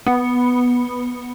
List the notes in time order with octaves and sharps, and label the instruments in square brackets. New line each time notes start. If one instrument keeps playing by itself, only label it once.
[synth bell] B3